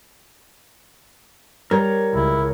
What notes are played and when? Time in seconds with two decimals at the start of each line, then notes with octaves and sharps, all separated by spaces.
1.71 G3 A#4 C#5 A#5
2.14 C#2 E4